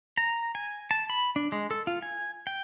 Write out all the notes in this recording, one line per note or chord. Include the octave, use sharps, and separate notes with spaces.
A#5
G#5
A5
B5
D4
G#3
A4
F4
G#5
G5